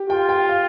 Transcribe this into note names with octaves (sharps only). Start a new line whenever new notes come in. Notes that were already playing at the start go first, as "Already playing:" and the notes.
Already playing: G4
F4 G5
G5
F5